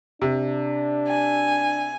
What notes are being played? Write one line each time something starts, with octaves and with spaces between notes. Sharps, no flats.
C3 D4
G#5